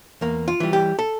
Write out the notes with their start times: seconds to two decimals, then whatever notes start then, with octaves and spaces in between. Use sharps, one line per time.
0.21 E2 A#3
0.48 F4
0.60 E3 G3
0.73 G4
0.99 A4